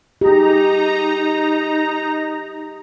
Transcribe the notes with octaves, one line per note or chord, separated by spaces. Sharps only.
D#4 G4 G#4 A#5